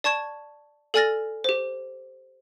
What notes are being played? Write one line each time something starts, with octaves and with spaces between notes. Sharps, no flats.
D5 A5 C#6 G#6 E7
A4 D5 G#5 F6 A6 A#6
G4 C5